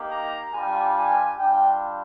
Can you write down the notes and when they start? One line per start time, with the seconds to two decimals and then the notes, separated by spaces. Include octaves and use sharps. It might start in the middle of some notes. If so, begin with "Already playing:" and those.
Already playing: A#3 D#4 G4
0.11 A#5
0.54 G3 D4 F4 G#5
0.96 G#5
1.38 G3 D4 F4 G5